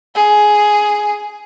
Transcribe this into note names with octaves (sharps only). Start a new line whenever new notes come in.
G#4